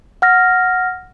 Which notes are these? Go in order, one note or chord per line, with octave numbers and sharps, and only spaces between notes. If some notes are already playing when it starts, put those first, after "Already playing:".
F#5 F6 A#6